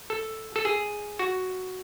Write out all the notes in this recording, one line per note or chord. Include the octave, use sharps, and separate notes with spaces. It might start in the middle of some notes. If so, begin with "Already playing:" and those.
A4
A4
G#4
F#4